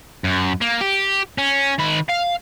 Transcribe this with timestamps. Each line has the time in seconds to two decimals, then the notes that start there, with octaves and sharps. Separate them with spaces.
0.24 F#2
0.61 A#3
0.81 G4
1.38 C#4
1.79 D#3 B5
2.09 F5